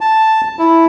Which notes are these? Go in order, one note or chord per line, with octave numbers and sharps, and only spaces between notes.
A5
E4